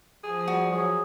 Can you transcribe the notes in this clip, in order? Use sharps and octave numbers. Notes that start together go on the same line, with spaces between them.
F3 G#4
G3 F#4
F#3 G#4